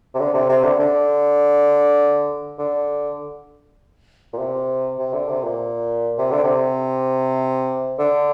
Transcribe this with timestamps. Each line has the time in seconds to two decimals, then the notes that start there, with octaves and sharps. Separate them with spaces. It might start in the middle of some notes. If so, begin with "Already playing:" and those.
0.14 C3
0.19 D3
0.34 C3
0.49 C3
0.64 D3
0.79 D3
2.58 D3
4.33 A#2
4.38 C3
4.99 C3
5.13 D3
5.28 C3
5.44 A#2
6.18 C3
6.31 D3
6.44 C3
7.99 D3